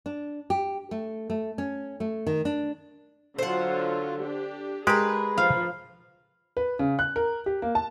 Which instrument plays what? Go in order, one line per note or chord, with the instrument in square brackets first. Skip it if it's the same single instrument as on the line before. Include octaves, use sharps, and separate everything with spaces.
[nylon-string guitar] D4
G4
A3
A3
C#4
A3
D#3
D4
[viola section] D3 F#3 F4 [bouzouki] C5 F#5
[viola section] D4 G4
[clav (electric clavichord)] G#3 G4 [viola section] G#4 [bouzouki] A#4 B4
[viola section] F3 [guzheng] F5
[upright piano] B4
C#3
F#6
A#4
G4
A#3
A5